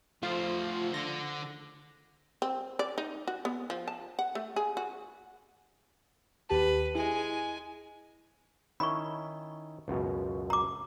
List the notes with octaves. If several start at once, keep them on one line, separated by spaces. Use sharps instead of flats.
F3 A3 F4 C5
D3 A#6
C4
D5
D#4
F#4
B3
F3
A5
F#5
A3
G#4
F#4
D#2 G4 B4 A5
G#3 E4 G#5
D#3 C#4 E4 B5 C#6
C#2 F#2 B2
A#5 D6